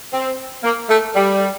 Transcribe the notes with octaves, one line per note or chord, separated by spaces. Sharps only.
C4
A#3
A3
G3